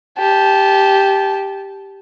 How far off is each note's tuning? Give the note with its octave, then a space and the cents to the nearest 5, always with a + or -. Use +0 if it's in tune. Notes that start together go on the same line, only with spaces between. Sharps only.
G4 +0 A5 -20